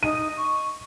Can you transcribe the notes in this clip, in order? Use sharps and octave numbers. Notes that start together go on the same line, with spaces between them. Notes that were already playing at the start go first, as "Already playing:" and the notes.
D#4 D#7
C#6